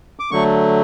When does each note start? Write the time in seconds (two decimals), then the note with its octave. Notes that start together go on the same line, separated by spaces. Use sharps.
0.19 D6
0.31 D3 F#3 A3 C#6